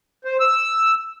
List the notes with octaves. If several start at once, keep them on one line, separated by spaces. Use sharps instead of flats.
C5
E6